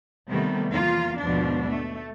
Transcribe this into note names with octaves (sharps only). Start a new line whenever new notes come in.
C3 D#3 G3 A3 B3
E2 F3 A#3 F4 F5
D#2 G#2 B2 F3 D4
A3